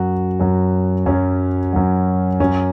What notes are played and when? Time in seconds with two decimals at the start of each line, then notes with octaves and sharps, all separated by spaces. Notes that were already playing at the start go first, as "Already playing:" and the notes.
Already playing: F#2 F#3 F#4
0.40 F#2 F#3
1.06 F#2 F#3 C#4
1.73 F#2 F#3
2.40 F#2 F#3 C#4